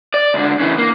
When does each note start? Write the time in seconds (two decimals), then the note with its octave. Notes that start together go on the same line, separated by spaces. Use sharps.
0.14 D5
0.34 C#2 D3
0.60 C#3 E3
0.78 A#3